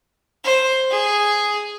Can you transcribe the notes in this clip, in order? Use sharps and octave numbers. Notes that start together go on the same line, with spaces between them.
C5
G#4